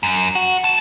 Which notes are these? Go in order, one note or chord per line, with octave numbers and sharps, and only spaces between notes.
F#2
F#4
G#2 A5